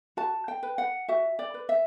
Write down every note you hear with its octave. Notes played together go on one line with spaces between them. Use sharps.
F#4 A5
G5
B4
F#5
F#4 E5
D5
B4
E5